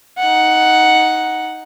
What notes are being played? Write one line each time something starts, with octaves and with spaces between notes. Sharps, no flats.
D#4 F#5